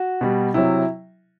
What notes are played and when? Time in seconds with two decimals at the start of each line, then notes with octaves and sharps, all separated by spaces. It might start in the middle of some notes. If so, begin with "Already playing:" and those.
Already playing: F#4
0.21 B2 G3
0.54 C3 F#3 E4